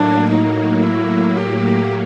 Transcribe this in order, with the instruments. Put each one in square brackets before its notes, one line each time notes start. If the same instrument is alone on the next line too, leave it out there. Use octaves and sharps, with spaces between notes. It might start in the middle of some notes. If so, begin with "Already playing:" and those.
Already playing: [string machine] A2 F#3 A#3 [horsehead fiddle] D4
[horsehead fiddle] D#4
E4
G4